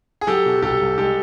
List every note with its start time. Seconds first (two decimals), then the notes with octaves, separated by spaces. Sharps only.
0.21 G#4
0.27 F#3 G4 A4
0.46 B2
0.62 C2 G4 A4
0.81 C2
0.98 G#3 G4 A4